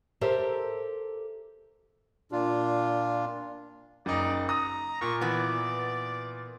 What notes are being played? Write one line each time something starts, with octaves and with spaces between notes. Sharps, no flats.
G4 A4 A#4 C5 E5
A#2 D4 F4
F#1 D#4 D5
A#5 D#6
A#2 C#6
E3 B3 D5